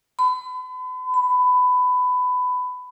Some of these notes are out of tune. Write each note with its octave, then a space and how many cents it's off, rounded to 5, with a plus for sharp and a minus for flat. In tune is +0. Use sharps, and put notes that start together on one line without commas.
B5 +40
B5 +20